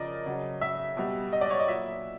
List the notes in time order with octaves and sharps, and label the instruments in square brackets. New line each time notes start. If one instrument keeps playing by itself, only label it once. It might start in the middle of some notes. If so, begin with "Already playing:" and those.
Already playing: [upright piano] C#3 F3 A#4 D5 D#5
C#3 F#3
E5
B2 G3
D#5
D5
C#5
D#5
A#2 F#3 E5